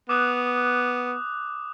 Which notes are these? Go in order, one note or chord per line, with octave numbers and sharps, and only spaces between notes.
B3 D6 D#6 F#6